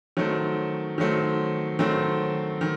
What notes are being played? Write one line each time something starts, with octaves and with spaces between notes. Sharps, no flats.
D#3 F#3 A3 C4
D#3 F#3 A3 C4
D#3 F#3 A3 C4
D#3